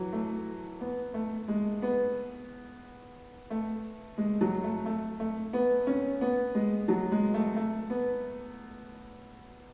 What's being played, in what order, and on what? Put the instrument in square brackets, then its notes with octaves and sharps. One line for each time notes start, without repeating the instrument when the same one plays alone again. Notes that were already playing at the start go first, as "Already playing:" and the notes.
Already playing: [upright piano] E3 F#3
A3
B3
A3
G#3
B3
A3
G#3
F#3
A3
A3
A3
B3
C#4
B3
G#3
F#3
G#3
A3
A3
B3